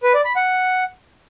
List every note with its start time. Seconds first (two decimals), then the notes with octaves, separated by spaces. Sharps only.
0.03 B4
0.14 D5
0.25 B5
0.36 F#5